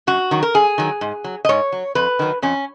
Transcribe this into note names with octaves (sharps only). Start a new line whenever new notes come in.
F#2 F#4
D#3 F#3
A#4
F#2 G#4
D#3 F#3
G#2
F#3
D#5
G#2 C#5
F#3
F2 B4
D#3 F#3
F2 C#4